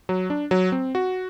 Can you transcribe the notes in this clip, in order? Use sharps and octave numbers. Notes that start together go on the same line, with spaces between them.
F#3
D4
F#3
C4
F#4